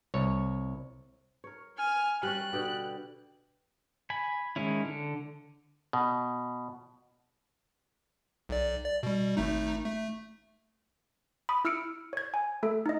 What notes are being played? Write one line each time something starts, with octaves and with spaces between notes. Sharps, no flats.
C2 C#5
A#4 C#5
G#5 F6
G3 C#4 F#6
B2 D3 G4
G#5 B5
D#3 G#3 C#4 E4
D3
B2
B1 D5
D5
B2 G3
G#1 A3 D#4
A3
B5 D#6
E4 E6 F6 C#7 D7
C#5 G#6
G#5
A3 A4
D#4 D#5